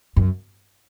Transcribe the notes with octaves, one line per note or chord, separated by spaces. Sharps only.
F#2